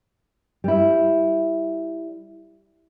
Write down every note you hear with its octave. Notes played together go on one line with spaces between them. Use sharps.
G3 E4